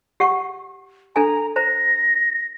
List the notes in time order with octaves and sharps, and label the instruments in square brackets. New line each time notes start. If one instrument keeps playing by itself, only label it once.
[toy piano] G4 F#5 C#6
[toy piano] D4 A4 G#5 [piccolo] A#5
[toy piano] C5 A#5 [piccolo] A#6